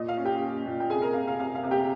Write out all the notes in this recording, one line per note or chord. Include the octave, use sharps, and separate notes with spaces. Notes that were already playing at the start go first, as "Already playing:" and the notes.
Already playing: A#2 D#5
F5
C#4
G4 G5
C#4
A#2
G5
C3 G#4 G#5
A#4 A#5
C3 F5
F5
C3 F5
F5
C3
G4 G5